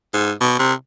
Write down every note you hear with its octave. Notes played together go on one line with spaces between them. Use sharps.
G#2
B2
C3